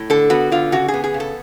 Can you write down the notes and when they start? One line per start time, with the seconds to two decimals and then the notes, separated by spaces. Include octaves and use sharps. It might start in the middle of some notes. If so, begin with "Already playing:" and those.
Already playing: A2
0.10 D3 A4
0.30 B3 F#4
0.52 D3 F4
0.72 C#3 F#4
0.88 G#4
0.94 B3
1.04 G#4
1.14 C#3
1.20 A4